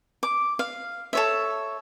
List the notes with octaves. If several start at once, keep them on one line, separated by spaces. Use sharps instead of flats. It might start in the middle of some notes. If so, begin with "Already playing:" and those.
D6
F5
A4 C#5 E5